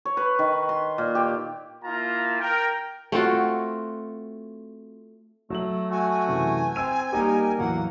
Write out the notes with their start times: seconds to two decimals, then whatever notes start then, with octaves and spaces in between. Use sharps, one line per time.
0.05 C#5
0.17 B4
0.39 D#3
0.69 C6
0.98 A#2
1.15 G4
1.85 A#3 E4 F4 A5 A#5
2.40 A#4 G5
3.12 A3 C4 F4 F#4
5.50 F#3 A3 F#7
5.91 A3 F#4 G#5
6.27 F#2 C3 E3
6.76 C4 E6 D#7
7.13 G3 A#3 D#4 G4 A#4
7.58 E2 A2 F#3 A#3 F#5